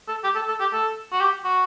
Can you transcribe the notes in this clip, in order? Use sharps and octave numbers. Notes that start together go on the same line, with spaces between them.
A4
G4
A4
A4
G4
A4
F#4
G4
F#4